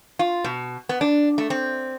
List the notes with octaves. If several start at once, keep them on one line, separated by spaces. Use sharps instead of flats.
F4
B2
B3
D4
A3
C4